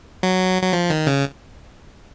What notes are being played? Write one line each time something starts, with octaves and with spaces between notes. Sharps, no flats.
F#3
F#3
F3
D#3
C#3